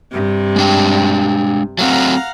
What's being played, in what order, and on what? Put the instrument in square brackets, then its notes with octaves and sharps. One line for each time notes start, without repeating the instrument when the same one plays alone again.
[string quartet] G2 C3
[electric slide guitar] G#3 D4 G5
[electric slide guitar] F#3 A3 C4 [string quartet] F5 F#5 A#5